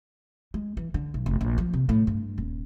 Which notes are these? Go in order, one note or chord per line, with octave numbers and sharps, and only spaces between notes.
G#3
E3
D3
B1
F1
A#1
F3
C3
A2
G2
D#1